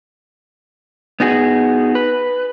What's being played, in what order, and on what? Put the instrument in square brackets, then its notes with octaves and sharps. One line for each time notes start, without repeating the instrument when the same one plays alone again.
[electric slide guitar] B3 D#4 F#4 G#4
B4